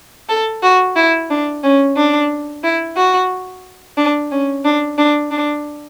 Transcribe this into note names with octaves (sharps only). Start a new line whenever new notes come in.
A4
F#4
E4
D4
C#4
D4
E4
F#4
D4
C#4
D4
D4
D4